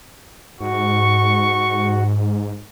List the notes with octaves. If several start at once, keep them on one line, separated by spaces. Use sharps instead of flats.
G#2 F#4 C#6